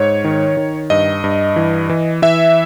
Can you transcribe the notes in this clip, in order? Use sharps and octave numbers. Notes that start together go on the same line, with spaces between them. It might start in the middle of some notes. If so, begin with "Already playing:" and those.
Already playing: G#2 C#5
D#3
D#3
G2 D#5
G2
E3
E3
E3 E5